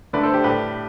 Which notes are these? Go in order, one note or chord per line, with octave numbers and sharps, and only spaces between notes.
D3 A3 B4 D5
A4 C5
G4
A2 G3 G4 B4